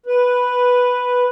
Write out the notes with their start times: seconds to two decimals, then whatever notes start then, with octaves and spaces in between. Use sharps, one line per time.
0.06 B4